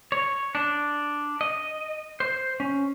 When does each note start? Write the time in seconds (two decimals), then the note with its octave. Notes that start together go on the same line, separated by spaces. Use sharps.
0.12 C#5
0.55 D4
1.41 D#5
2.20 C5
2.60 C#4